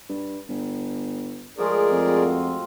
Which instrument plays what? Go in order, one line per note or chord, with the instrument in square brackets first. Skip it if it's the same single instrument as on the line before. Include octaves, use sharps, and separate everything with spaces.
[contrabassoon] G2
G1
[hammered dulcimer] F3 G#3 A3 [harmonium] G#4 A#4 D5
[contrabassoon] F2
[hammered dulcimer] C4 F4 F#4